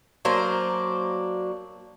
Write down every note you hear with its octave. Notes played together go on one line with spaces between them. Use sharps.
F#3 A#3 D4 C5